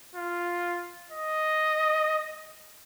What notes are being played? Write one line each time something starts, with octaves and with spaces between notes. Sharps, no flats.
F4
D#5